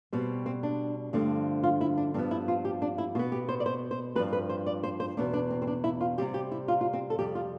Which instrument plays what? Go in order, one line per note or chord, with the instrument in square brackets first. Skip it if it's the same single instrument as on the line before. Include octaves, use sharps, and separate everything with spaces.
[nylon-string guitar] B2 G3 C4
C4
D4
G2 D3 F3 A3 C4
F4
E4
D4
G2 F3 B3 C4
E4
F4
G4
D4
E4
B2 B3 F4
G4
C5
D5
C5
C5
G2 F3 C4 B4
B4
C5
D5
C5
C5
E2 B2 B3 D4
D4
C4
C4
D4
E4
F4
C3 G3 C4 G4
G4
E4
F4
F4
C4
A4
F2 C3 G3 G4
F4